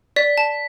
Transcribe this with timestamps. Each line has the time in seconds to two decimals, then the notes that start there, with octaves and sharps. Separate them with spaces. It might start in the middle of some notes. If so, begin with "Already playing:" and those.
0.16 D5 B6
0.38 A5